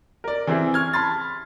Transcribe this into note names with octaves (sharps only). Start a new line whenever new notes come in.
A#4 D5
E3 C4 E4 G#4
C#6 F6 G#6
A5 B5 C6 A6